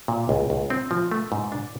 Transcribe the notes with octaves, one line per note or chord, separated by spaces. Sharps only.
A#2
C#2
C#2
C4
F3
A3
G#2
D4